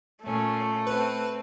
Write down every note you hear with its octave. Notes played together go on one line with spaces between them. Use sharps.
A#2 A3 C#4
C4 B4